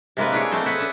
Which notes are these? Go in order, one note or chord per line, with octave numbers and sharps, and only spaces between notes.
C3 G#3 A#3 E4 B4
D4 E4 G#4 C#5 G#5
A3 A#3 C4 A4 C5 D#5
G#4 A4 B4 E5 F#5 G#5
C#4 D4 A4